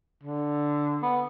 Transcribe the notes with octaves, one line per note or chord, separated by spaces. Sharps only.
D3
B3